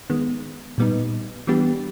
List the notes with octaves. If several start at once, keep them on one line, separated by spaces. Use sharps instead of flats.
D#3 G#3 B3
A#2 G3 B3 D#4
E3 G3 B3 D4 G4